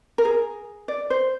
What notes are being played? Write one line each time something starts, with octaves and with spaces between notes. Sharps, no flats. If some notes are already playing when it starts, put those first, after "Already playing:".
A#4
G#4
D5
C5